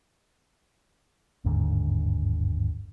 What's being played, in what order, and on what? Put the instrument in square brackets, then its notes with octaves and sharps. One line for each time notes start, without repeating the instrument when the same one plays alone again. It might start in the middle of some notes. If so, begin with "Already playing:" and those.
[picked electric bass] G1 D#2 G#2 D3